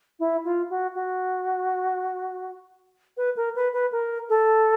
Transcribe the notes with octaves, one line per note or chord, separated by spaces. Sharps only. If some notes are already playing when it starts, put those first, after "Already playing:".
E4
F4
F#4
F#4
B4
A#4
B4
B4
A#4
A4